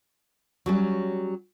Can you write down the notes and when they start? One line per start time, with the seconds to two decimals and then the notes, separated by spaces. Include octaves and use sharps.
0.66 F#3 G3 C#4